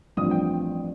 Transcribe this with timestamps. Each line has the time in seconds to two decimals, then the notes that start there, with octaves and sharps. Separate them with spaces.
0.17 A1 G2 F3 C4 D#6
0.31 G5